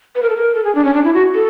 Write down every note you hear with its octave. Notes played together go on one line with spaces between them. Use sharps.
B4
A#4
A4
A#4
A4
G#4
D4
C#4
D4
E4
F#4
A4